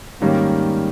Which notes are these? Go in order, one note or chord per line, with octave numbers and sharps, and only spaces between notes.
G#2 D#3 G3 A#3 C#4